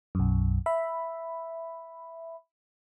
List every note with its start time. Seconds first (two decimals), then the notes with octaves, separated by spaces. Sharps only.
0.15 B1 F#2
0.66 E5 B5